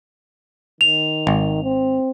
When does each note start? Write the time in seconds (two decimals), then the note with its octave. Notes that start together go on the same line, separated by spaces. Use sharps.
0.81 D#3 F7
1.27 G#1
1.64 C4